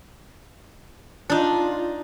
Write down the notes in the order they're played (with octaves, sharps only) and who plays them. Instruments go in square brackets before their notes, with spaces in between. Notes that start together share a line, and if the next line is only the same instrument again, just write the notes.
[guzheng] D4 D#4 [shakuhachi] F4